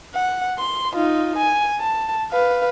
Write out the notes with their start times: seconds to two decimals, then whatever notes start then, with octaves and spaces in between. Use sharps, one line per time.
0.14 F#5
0.59 C6
0.94 D#4 F4
1.38 G#5
1.80 A5
2.31 B4 F5